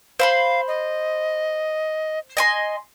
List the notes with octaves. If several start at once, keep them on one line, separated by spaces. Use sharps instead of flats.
C5 F5 B5 C6
D#5
D#5 G#5 C6